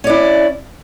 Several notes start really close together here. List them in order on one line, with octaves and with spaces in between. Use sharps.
C#4 D5 E4